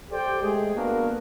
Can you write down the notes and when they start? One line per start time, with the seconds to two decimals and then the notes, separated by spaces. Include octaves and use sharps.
0.11 G4 A4 C5 D5 G5
0.42 G#3 A3 G#4
0.76 A#3 B3 D4 F#4 A#4